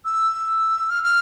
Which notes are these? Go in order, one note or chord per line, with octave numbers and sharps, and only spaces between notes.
E6
F6
F6